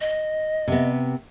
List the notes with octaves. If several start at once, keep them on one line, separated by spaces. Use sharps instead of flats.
D#5
C3 B3